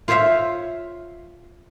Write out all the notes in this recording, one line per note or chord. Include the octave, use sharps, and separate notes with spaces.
F4 C5 C#5 E5 F5